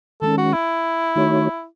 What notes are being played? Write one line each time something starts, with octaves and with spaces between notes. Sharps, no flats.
D#3 G#3 C#4 A4
F#4
E4
D#3 A3 D#4 F#4 C#5